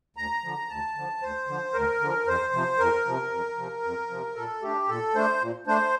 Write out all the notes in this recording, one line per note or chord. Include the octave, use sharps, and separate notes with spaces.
D2 A#5
D3 F3
D2 A5
D3 F3
D2 C5
D3 F3
D2 A#4
D3 F3
F2 C5
C3 F3
F2 A#4
C3 F3
F2
C3 F3
F2
C3 F3
A#2 A4
A3 D4 G4
A#2 A4
A3 D4 C5
A#2
A3 D4 C5